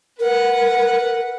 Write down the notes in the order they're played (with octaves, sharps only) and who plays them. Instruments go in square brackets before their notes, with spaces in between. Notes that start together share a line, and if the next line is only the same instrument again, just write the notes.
[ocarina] A#4 [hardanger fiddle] B4 F#5